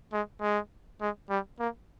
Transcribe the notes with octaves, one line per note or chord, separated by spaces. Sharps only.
G#3
G#3
G#3
G3
A#3